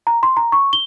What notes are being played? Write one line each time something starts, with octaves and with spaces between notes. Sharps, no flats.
A#5
C6
A#5
C#6
G7